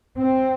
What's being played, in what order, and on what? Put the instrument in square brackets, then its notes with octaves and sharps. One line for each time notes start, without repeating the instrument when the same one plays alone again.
[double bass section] C4